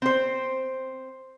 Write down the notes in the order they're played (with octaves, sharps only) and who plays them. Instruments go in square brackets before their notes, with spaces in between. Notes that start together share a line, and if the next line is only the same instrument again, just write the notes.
[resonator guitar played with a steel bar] C4 C5